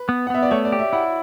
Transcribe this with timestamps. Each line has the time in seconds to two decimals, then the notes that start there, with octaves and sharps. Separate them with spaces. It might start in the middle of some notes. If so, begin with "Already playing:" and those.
Already playing: B4
0.09 B3
0.27 F#5
0.30 B3 E5
0.42 D5
0.51 A3 C#5
0.65 D5
0.72 G4
0.79 E5
0.93 E4 F#5